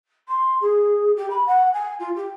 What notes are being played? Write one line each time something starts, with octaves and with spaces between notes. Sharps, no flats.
C6
G#4
G4
B5
F#5
G#5
F4
G4